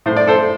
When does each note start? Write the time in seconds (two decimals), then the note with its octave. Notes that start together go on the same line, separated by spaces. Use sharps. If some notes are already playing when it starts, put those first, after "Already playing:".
0.06 A2 C5
0.16 D5
0.27 A4 C5